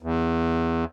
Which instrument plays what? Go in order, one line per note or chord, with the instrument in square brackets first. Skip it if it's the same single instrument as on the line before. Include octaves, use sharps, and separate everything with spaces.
[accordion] E2